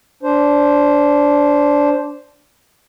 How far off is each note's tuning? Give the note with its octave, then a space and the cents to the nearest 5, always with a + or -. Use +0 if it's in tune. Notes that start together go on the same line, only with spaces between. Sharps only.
D4 -15 C5 +0